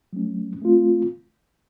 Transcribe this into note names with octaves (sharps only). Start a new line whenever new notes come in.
F#3 A3 C#4
A3 C4 F4